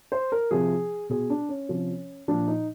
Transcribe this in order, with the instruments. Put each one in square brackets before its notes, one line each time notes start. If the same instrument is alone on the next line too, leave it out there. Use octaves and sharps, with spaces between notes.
[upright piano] C5
A#4
C3 F3 G#4
B2 G#4
D4
C#4
C3 F3
A#2 F3 D4
D#4